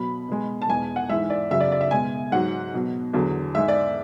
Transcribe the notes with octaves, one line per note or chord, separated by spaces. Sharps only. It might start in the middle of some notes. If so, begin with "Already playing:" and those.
Already playing: B2 F#3 B5
B2 G#3
A5
E2 B2 G#3 G#5
F#5
G#2 E3 G#3 E5
D5
F#2 C#3 F#3 E5
D5
D5
E5
B2 G#3 G#5
G#2 F#3 F#5
B2 F#3
E2 D3 F#3
G#2 G#3 E5
D5